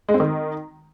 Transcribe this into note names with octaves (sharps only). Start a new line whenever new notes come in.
G#3
C4
D#3